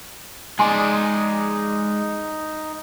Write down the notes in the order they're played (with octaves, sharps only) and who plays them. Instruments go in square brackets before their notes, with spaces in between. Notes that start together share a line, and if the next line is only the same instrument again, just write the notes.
[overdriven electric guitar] G#3 D5 [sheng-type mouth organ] D#4 [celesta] G#5 C6